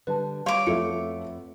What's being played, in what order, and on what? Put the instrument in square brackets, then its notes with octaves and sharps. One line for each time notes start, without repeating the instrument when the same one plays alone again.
[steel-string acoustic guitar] D3 G3 D4 [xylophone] B4 A5
[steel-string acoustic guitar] G3 F4 [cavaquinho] C#5 D6 [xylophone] F5 C6
[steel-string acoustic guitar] F2 A3 B3 [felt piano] F4 A4 E5 [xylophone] C#7